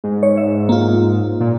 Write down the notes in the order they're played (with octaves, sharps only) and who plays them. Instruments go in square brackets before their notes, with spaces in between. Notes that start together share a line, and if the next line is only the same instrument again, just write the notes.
[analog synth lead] G#2
[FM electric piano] C#5
E5
A#3 F4
[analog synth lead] A#2